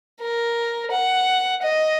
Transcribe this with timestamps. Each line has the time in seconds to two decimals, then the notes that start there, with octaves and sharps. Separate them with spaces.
0.21 A#4
0.91 F#5
1.62 D#5